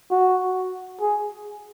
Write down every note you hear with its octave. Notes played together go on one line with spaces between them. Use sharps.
F#4
G#4